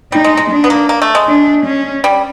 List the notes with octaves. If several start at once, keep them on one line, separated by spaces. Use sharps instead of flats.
G3 D#4
G#3
G#3
D4
B3
A#3
A#3
A3
G#3
D4
C#4
G3